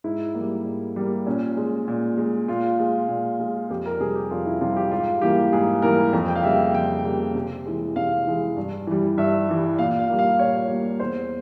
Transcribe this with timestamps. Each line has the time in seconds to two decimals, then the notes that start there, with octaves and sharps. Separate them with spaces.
0.04 G#2 E4
0.35 A#3
0.40 G3
0.65 G#2
0.96 G3 A#3
1.27 A#2 C#4
1.57 G#3
1.88 A#2
2.17 G#3
2.48 A#2 F4
2.79 G#3
3.09 A#2
3.40 G#3
3.70 F2 G4
3.86 A#4
4.00 C3 G3 G#4
4.15 G4
4.31 F2 F4
4.46 E4
4.61 C3 G3 F4
4.76 G4
4.91 G#2 F4
5.21 E3 G3 A#3 G4
5.53 G#2 G#4
5.82 E3 G3 A#3 A#4
6.13 F2
6.28 G5
6.36 F5
6.43 C#3 G3 A#3 E5
6.74 F2 G5
7.05 C#3 G3 A#3
7.35 C3
7.65 E3 G#3
7.96 C3 F5
8.27 E3 G#3
8.57 G2
8.87 E3 G3
9.17 G2 E5
9.48 E3 G3
9.79 A#2 F5
9.99 F5
10.08 G3 A#3
10.19 F5
10.39 A#2 C#5
10.69 G3 A#3
11.00 E2 C5